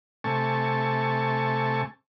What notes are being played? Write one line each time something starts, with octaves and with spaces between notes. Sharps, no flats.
C3 A3 G#5 A5 C#6